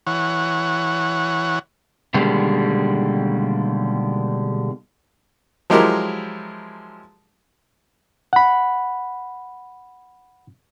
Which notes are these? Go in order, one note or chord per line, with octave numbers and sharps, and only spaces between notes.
E3 C#5 F#5
B2 D3 D#3 G3 G#3 A#3
F3 F#3 G#3 E4 G4 A#4
F#5 B5